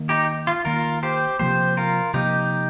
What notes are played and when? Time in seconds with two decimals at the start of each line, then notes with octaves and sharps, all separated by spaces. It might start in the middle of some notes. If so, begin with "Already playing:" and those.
Already playing: D#3 A#3
0.09 D#4 G4
0.47 F4
0.65 D#3 A#3 F4 A#4
1.03 G4 C5
1.39 C3 F3 A#3 G4 C5
1.77 F4 A#4
2.14 C3 F3 A#3 D#4 G4